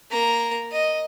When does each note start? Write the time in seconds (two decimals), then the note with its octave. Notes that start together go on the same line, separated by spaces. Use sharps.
0.11 A#3 A#5
0.72 D#5